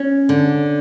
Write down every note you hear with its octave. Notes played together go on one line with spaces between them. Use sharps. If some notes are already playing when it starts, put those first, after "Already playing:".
Already playing: C#4
D3